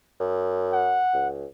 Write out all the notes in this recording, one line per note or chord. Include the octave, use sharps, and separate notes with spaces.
F#2
F#5
C#2